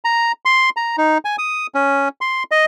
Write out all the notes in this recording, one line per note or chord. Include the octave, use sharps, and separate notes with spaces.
A#5
C6
A#5
D#4
G#5
D#6
C#4
C6
D#5